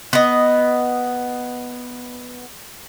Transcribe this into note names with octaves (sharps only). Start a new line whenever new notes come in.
B3 D#5